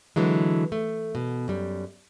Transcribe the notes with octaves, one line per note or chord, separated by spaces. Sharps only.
D3 E3 F#3 G#3
A3
B2
F#2 G3